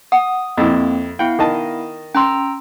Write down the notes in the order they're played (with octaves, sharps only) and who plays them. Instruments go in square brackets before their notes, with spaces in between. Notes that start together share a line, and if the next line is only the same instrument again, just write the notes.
[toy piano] F#5 [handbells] D#6
[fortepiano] F2 E4 [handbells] A#3 C4
[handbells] B3 E4 F5 [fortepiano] G5
[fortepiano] D#3 D#5 A5
[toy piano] C#4 C6 [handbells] G5 A#5 E6